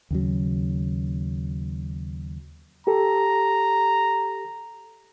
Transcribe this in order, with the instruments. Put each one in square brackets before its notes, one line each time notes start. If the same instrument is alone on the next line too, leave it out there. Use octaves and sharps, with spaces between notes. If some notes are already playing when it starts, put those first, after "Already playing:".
[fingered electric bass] D#2 C#3 F#3
[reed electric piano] G4 A4 [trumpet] A#5